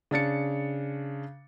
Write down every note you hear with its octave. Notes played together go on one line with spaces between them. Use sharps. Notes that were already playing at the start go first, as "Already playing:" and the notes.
C#3 D4 A6 C#7